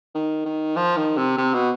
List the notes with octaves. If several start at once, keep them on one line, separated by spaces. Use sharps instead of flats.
D#3
D#3
F3
D#3
C3
C3
B2